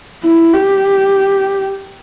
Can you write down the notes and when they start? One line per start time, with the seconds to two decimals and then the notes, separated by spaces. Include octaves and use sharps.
0.23 E4
0.54 G4